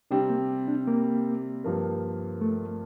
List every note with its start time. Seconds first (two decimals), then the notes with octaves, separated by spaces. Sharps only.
0.11 C3 G3 C4 D4
0.30 A#3
0.68 D4
0.88 A#3
1.64 G2 F3 A#3
2.41 A3